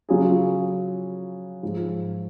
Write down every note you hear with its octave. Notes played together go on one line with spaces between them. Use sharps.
C#3 F#3 C#4 F4 G#4
G#2 F3 G#3